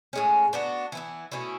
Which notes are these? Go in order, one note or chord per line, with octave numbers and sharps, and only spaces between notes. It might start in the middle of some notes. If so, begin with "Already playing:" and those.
A2 G#3 C#4
B3 D4 F#4
E3 B3 E4
B2 A3 C#4 E4